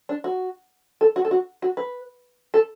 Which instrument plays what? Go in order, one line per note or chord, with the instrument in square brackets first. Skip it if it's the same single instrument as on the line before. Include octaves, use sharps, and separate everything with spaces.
[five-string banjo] D4
F#4
A4
F#4
A4
F#4
F#4
B4
A4